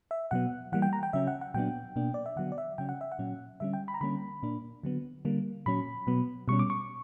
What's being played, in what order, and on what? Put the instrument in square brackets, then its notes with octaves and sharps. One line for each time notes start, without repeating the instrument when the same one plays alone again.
[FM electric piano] E5
B2 F#3 B3 F#5
E3 G3 A#3 F#5
G5
A#5
G5
C#3 F#3 C#4 E5
F#5
F#5
A#2 F#3 B3 D4 G5
B2 A#3 D4
D5
E5
D3 F#3 B3 F#5
D5
E5
C#3 F#3 C#4 G5
F#5
E5
F#5
A#2 F#3 C#4
D3 G3 C#4 E5
G5
B5
A#5
D3 G3 A#3 C#4 B5
A#2 A#3 D4
D3 F#3 B3
D3 G3 A#3
A#2 F#3 C#4 B5
B2 F#3 B3
B2 G3 C#4 C#6
D6
C#6